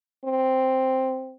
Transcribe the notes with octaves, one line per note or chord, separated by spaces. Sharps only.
C4